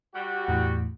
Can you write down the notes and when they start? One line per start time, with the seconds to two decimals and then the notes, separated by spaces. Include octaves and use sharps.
0.14 G3 F#4
0.48 E2 A2 E3